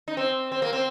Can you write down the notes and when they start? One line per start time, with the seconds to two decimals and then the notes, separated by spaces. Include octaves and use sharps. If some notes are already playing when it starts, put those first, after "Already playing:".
0.08 D#4
0.17 C4
0.52 C4
0.62 A#3
0.73 C4